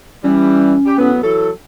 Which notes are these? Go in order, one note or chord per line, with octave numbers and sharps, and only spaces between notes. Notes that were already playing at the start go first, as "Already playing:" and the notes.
E3 G3 C#4
G4
A2 F#3 B3
E3 F#3 A4